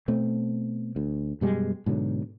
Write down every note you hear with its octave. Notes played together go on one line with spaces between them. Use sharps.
B2 A3 C4
D2
F#2 B2 G3 G#3
G#2 B2 D3 F#3